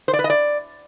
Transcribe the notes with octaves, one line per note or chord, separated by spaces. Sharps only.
C5
D5
B4
D#5
D5